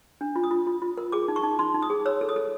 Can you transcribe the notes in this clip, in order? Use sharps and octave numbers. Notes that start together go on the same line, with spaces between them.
D4
F4
D#6
F4
F4
F4
A#4
G#4 D6
D#4
C#6
D#4
D#4 C6
D#4
D#6
G#4
C#5 E6
A4
D#6
A4